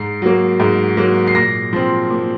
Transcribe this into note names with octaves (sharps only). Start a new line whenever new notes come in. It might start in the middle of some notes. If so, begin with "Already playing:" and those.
Already playing: G#2 C7
F#3 A#3
G#2
F#3 A#3
C7
A#2 A#6
F3 C4
A#2